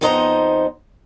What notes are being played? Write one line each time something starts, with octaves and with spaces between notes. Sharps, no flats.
F2 B3 D#4 C5 D#5 A#5